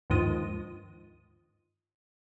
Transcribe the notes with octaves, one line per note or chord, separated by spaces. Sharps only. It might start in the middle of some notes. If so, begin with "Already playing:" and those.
G1 D#2 G#2 F3 D#6